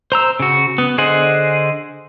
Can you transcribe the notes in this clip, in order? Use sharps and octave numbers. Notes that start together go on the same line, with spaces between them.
C5 A#5 E6
C#3 F#4
B3
D3 G#4 C5 D#5 F#5